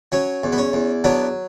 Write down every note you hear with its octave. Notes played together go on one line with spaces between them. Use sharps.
F#3 C#4
E2
B3
C#4
E2
F#3 B3 D4